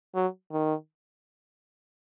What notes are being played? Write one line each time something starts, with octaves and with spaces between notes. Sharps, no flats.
F#3
D#3